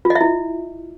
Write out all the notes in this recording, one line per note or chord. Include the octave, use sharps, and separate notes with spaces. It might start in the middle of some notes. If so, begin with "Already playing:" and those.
F4
D#5
E5
E4